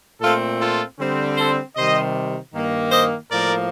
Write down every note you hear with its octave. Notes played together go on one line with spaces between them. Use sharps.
A#2 A3 C4 F4 A4
F4 A4
D3 G3 C4
A4 C5
C3 D#3 G3 C5 D#5
G2 D#3 A#3
C5 D#5
A2 F3 A#3 A#4 D5